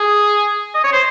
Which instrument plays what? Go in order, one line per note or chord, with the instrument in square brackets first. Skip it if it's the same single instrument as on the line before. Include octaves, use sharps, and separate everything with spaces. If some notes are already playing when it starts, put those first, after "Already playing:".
Already playing: [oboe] G#4
D#5
C#5
C5